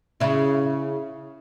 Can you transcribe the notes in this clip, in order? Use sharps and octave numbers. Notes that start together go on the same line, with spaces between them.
C#3 E4